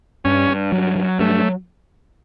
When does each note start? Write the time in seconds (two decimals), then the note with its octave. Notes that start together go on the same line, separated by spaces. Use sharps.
0.25 G2 C#4
0.49 G2
0.72 F#3
0.96 F#3
1.19 G2 A3